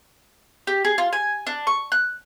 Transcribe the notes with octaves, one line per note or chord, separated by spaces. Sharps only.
G4
G#4
F4
G#5
D4
C#6
F#6